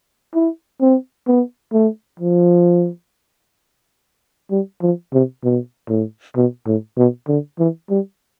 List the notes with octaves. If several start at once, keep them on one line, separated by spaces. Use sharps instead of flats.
E4
C4
B3
A3
F3
G3
F3
C3
B2
A2
B2
A2
B2
D3
E3
G3